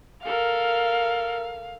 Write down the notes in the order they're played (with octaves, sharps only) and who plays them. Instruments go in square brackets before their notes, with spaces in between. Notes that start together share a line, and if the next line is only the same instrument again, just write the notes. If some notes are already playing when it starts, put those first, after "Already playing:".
[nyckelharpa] A4 A#4 [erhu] F5